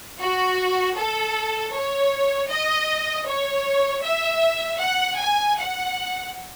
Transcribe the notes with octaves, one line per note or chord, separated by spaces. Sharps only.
F#4
A4
C#5
D#5
C#5
E5
F#5
G#5
F#5